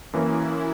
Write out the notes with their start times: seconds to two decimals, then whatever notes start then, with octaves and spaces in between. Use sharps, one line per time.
0.13 F#2 E3 A#3 C#4 E4